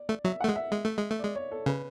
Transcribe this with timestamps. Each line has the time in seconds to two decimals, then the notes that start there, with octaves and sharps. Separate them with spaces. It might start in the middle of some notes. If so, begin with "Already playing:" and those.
Already playing: D5
0.09 A3
0.25 F#3 E5
0.40 A3 F#5
0.48 G#3
0.56 E5
0.72 G#3
0.85 A3
0.98 G#3
1.10 A3
1.19 G#3 D5
1.35 C#5
1.51 A4
1.66 C#3 B4